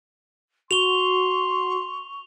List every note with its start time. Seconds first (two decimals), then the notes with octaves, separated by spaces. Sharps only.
0.71 F#4 C6 C#6 F7 G7